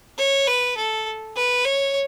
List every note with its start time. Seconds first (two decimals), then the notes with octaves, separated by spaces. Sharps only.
0.18 C#5
0.47 B4
0.77 A4
1.36 B4
1.65 C#5